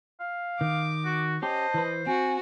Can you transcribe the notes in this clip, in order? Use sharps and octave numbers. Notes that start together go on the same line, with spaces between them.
F5
D#3 D6
F#4
C#4 G4 C5 D#5 A5
E3 B4
C4 F#4 G#5